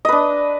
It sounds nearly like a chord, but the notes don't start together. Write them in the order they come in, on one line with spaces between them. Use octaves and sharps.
D#5 B4 D4